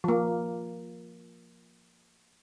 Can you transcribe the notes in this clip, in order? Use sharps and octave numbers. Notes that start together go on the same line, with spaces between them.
F3 A#3